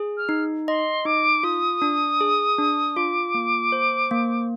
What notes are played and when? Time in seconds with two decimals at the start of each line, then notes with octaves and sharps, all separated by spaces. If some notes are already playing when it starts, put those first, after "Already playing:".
Already playing: G#4
0.17 F6
0.29 D#4
0.68 D#5 C6
1.05 D#4 D6
1.43 F4 D#6
1.82 D4
2.21 G#4
2.58 D4
2.96 F4 D6
3.34 A#3
3.72 C5
4.11 A#3